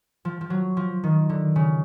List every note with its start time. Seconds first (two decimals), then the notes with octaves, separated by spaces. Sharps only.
0.25 F3
0.41 F3
0.50 F#3
0.77 F3
1.03 D#3
1.29 D3
1.56 C#3